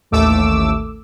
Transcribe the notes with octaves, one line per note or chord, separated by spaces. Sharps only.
A1 D#2 A3 D6 E6